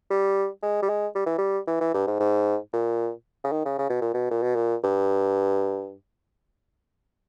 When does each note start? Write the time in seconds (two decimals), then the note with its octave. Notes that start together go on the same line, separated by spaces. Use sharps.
0.10 G3
0.63 G#3
0.82 G3
0.89 G#3
1.15 G3
1.26 E3
1.38 G3
1.67 E3
1.81 E3
1.94 G2
2.07 G#2
2.20 G#2
2.73 A#2
3.44 C#3
3.52 D#3
3.65 C#3
3.79 C#3
3.90 B2
4.01 A#2
4.14 B2
4.31 A#2
4.43 B2
4.55 A#2
4.84 G2